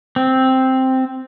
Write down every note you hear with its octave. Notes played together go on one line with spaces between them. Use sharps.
C4